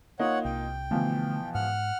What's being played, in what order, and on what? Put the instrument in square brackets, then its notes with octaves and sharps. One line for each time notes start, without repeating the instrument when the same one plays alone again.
[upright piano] A#3 D#4 F4 [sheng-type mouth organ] C#5 F#5
[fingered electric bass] C2 [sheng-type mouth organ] G5
[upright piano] B2 E3 F3 [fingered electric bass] D3 A3
[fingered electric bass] G#2 [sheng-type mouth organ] F#5 F6